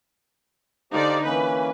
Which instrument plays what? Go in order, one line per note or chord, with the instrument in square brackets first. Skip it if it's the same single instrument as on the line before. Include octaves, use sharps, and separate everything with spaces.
[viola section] D3 D#4 D5 [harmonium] G4 C5 F5
[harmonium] E3 A#3 C#4 [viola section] B4